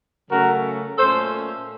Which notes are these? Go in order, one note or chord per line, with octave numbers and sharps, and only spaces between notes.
C#3 F#3 A3 C#4 F#4 A#4
A#2 A3 C#4 A4 C5